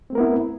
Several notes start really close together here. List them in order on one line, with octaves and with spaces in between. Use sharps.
C4 A3 A#4 B3 E4